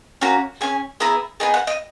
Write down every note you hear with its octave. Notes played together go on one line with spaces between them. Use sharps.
A#3 C#4 F#4 A#5
C#4 G#4 G#5
B3 E4 G#4 A#5
B3 D#4 G#4 G#5
F#5
D#5